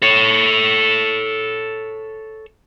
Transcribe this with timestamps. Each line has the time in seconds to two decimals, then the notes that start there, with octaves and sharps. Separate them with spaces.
0.02 A4 C#5